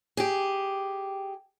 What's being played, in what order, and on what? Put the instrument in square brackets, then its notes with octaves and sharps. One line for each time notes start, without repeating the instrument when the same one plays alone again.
[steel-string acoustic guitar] G4 G#4